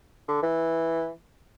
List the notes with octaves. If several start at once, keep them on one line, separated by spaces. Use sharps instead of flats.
D3
E3